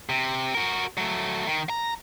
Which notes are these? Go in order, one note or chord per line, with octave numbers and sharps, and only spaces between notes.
C3
F#4 A#4
F#3 A3
D#3
A#5